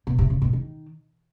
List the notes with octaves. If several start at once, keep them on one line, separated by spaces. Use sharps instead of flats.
B2
C3
C#3
B2
D#3